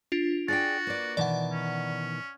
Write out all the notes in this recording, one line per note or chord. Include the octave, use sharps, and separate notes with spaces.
D4 F4
F#4 G#4 D5 G5 A6
A#3 B4 D5
B2 D#3 E3 D5 F#5
C#4